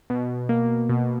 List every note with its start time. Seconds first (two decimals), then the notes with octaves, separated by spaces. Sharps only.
0.10 B2
0.49 A#3
0.89 B2